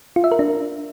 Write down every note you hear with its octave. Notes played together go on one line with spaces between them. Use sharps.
F4
E5
A#4
D4